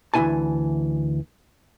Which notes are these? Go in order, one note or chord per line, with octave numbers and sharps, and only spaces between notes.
D2 E3 C4 E4 G#5 A5